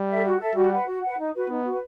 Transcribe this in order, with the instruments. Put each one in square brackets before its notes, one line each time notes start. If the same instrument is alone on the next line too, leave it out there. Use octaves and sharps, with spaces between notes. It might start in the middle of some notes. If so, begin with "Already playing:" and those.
Already playing: [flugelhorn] G3
[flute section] A4 E5
F#4
A4 E5
[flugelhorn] G3 [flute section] F#4
[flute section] B4 F#5
F#4
F#5
B4
D#4
F#4 B4
[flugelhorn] B3 [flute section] D#4
[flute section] F#4 B4